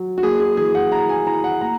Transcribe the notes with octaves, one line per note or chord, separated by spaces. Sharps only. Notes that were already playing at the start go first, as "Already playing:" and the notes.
Already playing: F#3
F#4
A#3 G#4
G#4
E3 G#4
F#5
E4 A#5
G#5
E4 A#5
F#5
A#3 A#5